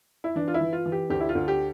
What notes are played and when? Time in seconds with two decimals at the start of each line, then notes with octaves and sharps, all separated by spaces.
0.24 E4
0.36 E3 D4
0.48 F4
0.54 E4
0.61 E3
0.73 F4
0.86 E3
0.92 G4
1.10 D2 G4
1.20 E4
1.29 F4
1.35 D2
1.48 G4